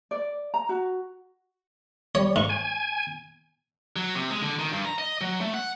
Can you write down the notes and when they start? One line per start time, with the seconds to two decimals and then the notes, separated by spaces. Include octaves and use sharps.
0.11 D5
0.54 A#5
0.69 F#4
2.15 G3 C#5
2.36 G#2 C#6
2.49 G#5
3.96 F#3
4.15 C3
4.31 G#3
4.42 D3
4.59 D#3
4.72 G2
4.85 A#5
4.98 D#5
5.21 F#3
5.41 A3
5.54 F#5